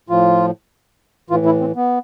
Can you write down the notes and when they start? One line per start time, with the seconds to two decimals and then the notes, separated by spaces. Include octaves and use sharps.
0.09 A2 F3 F4
1.30 A2 E3 F4
1.46 E4
1.61 C4
1.76 B3